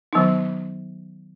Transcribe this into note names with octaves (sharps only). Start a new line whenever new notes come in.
D#3 F#3 B3 D#4